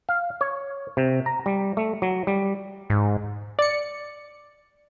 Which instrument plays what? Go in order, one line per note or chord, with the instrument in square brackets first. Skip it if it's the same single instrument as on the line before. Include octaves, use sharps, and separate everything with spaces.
[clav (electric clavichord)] F5
C#5
C3
A#5
G3
A3
F#3
G3
[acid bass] G#2
[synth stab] D5 C#7